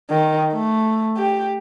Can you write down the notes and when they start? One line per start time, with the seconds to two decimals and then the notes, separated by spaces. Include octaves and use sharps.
0.10 D#3
0.53 A3
1.17 G4